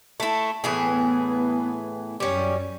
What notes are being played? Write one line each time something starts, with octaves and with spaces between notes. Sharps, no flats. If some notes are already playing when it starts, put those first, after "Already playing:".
A3 E4
A2 E3 B3 G#4
F#2 G3 C#4